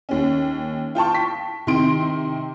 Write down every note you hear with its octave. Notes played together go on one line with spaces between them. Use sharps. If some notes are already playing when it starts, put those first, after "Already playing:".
D#2 C#4
F4 G5 A5 C#6
B6
C3 D#3 C4 C6 D7